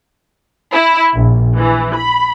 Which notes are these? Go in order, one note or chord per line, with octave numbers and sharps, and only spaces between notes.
E4
A#1
E3
B5